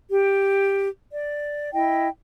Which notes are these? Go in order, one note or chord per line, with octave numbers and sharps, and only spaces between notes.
G4
D5
E4 D#5 G5